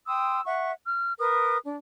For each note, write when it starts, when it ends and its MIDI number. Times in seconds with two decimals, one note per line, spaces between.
0.07 0.41 79
0.07 0.41 84
0.07 0.41 87
0.07 0.41 88
0.45 0.71 76
0.45 0.71 78
0.45 0.71 85
0.85 1.13 89
1.19 1.57 70
1.19 1.57 71
1.19 1.57 87
1.62 1.75 62